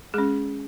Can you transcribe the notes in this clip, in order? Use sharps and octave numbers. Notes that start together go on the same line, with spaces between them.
G#3 C#4 G#4